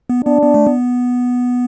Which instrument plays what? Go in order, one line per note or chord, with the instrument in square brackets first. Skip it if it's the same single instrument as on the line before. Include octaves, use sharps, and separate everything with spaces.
[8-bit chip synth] B3
[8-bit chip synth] B3 [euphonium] D4
[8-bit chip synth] B3
A3
B3